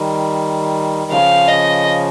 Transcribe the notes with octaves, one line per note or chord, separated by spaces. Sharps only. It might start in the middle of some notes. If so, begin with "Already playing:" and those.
Already playing: D#3 G3
C#3 F3 F5
D#5